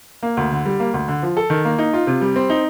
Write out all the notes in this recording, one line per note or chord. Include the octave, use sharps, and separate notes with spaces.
A#3
D2
D3
G3
A#3
D2
D3
F3
A4
D#3
A#3
D#4
F4
C3
G3
C4
D#4